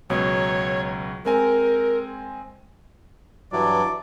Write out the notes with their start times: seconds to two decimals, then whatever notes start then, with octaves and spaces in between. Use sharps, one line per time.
0.10 C#2 B2 F#3 C#5
1.25 G#3 C4 A#4 G#5
3.52 G2 E3 F#3 D5